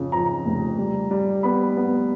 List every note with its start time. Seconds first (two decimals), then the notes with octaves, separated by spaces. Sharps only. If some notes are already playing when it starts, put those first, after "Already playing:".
Already playing: F2 C#3
0.12 F2 A#5
0.46 F1
0.78 G3
1.11 G3
1.43 B3 B5
1.77 B3